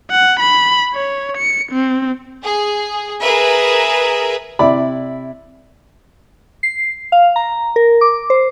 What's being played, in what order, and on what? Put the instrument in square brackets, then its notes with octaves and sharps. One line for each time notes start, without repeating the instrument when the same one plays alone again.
[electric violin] F#5
B5
C#5
C#7
C4
[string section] G#4
G#4 A#4 B4 E5
[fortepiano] C3 E4 D5 B5
[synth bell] C7
F5
A#5
A#4
D6
C5